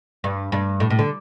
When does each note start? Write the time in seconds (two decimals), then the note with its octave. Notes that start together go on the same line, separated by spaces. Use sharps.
0.24 G2
0.52 G2
0.80 A2
0.90 A2
0.99 D3